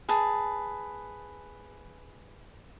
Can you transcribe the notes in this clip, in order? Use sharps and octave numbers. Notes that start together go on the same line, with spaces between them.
G#4 B4 A5